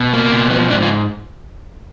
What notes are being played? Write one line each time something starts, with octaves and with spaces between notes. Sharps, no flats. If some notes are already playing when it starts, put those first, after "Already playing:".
Already playing: B2
A#3
B2
F3 B3
G#2 D4
F4